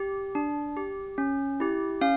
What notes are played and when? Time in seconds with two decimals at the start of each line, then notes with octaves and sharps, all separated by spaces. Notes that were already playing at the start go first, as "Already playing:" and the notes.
Already playing: G4
0.35 D4
0.77 G4
1.18 C#4
1.60 E4 G4
2.01 C#4 F5